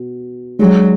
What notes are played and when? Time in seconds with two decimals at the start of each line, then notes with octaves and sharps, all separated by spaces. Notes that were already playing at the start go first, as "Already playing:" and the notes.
Already playing: B2
0.59 F#3 G#3 D4 G#4